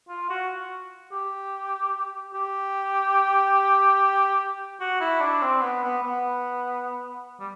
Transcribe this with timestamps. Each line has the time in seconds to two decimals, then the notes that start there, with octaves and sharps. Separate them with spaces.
0.09 F4
0.30 F#4
1.12 G4
2.34 G4
4.80 F#4
5.01 E4
5.21 D4
5.42 C4
5.62 B3
5.83 B3
6.03 B3
7.40 G3